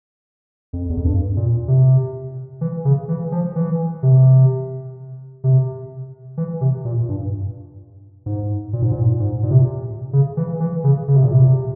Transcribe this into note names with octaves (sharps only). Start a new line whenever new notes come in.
F2
E2
F2
G2
A#2
C3
E3
C#3
E3
F3
E3
C3
C3
E3
C3
A#2
G2
G#2
A#2
G#2
A#2
G#2
A#2
C3
C#3
E3
E3
C#3
C#3
C3
A#2
C3